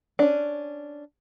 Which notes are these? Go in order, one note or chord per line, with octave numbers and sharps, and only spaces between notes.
C#4 D4